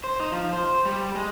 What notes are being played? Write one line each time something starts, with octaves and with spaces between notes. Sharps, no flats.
C5
D#4
F3
C5
G3
G#3